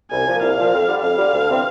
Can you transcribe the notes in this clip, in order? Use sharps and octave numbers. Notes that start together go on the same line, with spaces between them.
C2 G#5
A#2 F3
C2 F5
A#2 F3
F2
D3 G3
F2 F5
D3 G3
D2
C3 E3 G3 C4